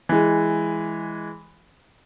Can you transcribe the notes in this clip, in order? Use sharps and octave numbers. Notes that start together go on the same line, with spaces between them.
E3 G#3